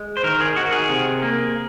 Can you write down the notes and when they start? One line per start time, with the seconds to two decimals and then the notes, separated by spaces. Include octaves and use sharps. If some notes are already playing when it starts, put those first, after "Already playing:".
Already playing: G#3
0.17 C5
0.24 D#3 A#4
0.41 G#4
0.56 D#3 F#4
0.72 G#4
0.89 C3
1.22 A#3